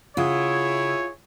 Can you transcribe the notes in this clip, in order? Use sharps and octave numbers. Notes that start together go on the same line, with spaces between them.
C#3 E4 F4 G#4 C#5 F#5 D#6